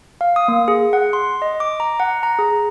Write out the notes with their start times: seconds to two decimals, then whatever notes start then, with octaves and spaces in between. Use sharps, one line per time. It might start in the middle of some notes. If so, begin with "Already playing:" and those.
0.21 F5
0.36 D#6
0.48 A#3
0.68 G#4
0.93 F#5
1.13 C6
1.42 D#5
1.60 D6
1.80 A#5
2.00 F#5
2.23 A#5
2.39 G#4